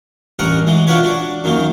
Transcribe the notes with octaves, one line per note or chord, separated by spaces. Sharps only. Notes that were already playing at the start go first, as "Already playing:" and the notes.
A1 G2 C#4 A#4 F#5 A#5
E3 F#3 G#3
D4 F4 F#4 A#4 B4 C#5
D4 F#4
F#2 D#3 F#3 A#3